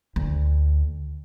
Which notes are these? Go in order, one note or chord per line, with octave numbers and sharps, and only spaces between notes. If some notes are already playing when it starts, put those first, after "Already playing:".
D2